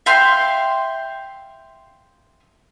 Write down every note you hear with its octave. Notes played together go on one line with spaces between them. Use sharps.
E5 F5 G5 C6